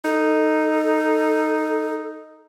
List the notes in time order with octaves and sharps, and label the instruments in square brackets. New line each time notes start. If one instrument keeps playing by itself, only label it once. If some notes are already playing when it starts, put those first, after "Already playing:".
[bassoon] D#4 [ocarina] A4